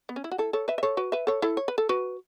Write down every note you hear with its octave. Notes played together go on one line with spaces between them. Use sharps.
B3
C#4
E4
F#4
E4 A4
A4 C#5
B4 E5
E5
A4 C#5
F#4 B4
B4 E5
A4 C#5
E4 A4
C#5
B4
A4
F#4 B4